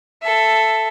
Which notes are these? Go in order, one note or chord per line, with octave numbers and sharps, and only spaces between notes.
A4 E5